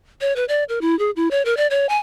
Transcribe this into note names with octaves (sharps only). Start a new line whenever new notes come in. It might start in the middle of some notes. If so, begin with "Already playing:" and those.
C#5
B4
D5
A#4
E4
G#4
E4
C#5
A#4
D5
C#5
G#5